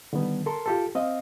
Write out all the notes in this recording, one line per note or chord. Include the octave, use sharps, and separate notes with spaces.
D3 D#3 G3 B3
A4 A#4 C6
F4 G4 A4
C4 D#5 F5